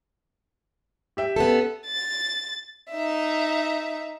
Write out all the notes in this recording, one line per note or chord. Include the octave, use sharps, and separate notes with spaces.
G4 E5 G5
B3 C#4 A4
A6
D#4 E5